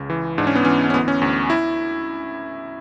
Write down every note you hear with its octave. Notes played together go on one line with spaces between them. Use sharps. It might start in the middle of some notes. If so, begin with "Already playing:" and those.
Already playing: C#2 C#3
E3
G#2 D4
C#4
B3
E3 C#4
C#4
D2 B3
C#4
D2
E4